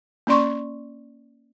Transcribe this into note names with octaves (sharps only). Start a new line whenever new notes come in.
A#3 C#4 D5 C6 C#6